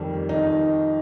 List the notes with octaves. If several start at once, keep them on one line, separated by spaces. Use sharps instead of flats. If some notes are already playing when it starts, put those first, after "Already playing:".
Already playing: F2 D#3 G3
D#4